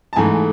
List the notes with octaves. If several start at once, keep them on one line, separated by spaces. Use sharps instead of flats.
A5
G#2 E3 A3 G#5